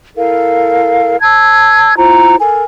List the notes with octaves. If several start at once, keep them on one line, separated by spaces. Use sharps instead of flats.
E4 A4 A#4 F5
A5 E6 G#6
E4 F4 C5 A#5
A4 A#4 G#5